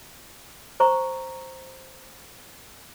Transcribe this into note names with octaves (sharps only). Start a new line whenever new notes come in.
C5 A#5 C#6